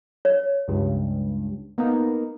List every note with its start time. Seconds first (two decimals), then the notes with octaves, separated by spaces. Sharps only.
0.25 C#5
0.68 C#2 G2
1.78 A#3 B3 D#4